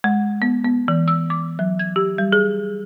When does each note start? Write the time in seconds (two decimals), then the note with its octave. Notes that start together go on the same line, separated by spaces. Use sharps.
0.04 G#3
0.42 B3
0.64 B3
0.88 E3
1.08 E6
1.30 D6
1.59 F#3
1.79 G#6
1.96 G4
2.18 G3
2.32 G#4